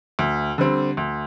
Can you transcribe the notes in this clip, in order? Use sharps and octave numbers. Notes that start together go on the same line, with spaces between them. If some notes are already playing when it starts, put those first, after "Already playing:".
D2
D3 G3 C4
D2